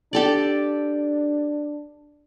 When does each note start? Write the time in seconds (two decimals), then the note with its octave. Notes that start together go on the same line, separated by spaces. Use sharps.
0.13 D4 G4 A4 D5